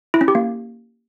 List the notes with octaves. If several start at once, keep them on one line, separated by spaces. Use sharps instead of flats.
E4
C#4
G4
A#3